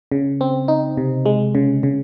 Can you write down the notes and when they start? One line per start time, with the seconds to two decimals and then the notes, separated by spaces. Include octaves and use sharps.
0.12 C#3
0.41 C4
0.68 D#4
0.97 C3
1.26 G#3
1.55 C#3
1.83 C#3